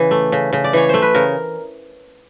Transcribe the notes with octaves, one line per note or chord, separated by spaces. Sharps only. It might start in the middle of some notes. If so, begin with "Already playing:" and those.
Already playing: C#3 E3 B4
A3
C#3
C#3
D5
E3 C#5
A3 C5
B4
C#3 A#4